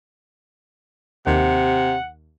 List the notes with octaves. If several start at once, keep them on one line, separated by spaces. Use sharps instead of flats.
D#2 C3 F#5